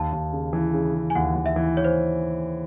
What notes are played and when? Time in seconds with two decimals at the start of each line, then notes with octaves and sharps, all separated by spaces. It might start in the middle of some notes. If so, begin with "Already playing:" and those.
Already playing: D#2 A5
0.12 D#2
0.33 C#3
0.53 E3
0.74 C#3
0.95 C#3
1.10 G#5
1.15 D#2 F#5
1.35 D#2
1.46 E5
1.56 E3
1.77 C#5
1.85 C5